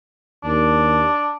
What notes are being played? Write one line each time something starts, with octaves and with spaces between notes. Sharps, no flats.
D#2 D4